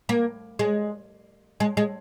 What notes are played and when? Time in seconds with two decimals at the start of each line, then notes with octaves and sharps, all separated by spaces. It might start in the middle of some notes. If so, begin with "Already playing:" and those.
0.09 A#3
0.59 G#3
1.60 G#3
1.77 G#3